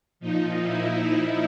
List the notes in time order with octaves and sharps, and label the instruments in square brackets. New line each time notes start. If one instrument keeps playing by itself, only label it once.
[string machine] A#2 F3 D#4
E4
D#4